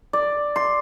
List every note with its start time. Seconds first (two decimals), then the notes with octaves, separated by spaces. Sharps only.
0.13 D5
0.56 C6